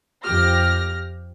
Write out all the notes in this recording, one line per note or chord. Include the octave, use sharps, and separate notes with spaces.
F2 G4 F6 A#6